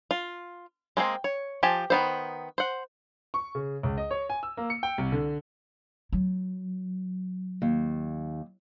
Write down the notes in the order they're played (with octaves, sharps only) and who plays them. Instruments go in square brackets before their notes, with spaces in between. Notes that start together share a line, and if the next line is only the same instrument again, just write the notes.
[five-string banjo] F4
G#3 A#3 C4 G#4
C#5
F3 G4 G#5 A5
D#3 B3 C5
C5 F#5
[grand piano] C#6
C#3
C#2
D#5
C#5
G#5
E6
A#3
C#7
G5
C2
D3
[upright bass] F#3
[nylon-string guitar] D#2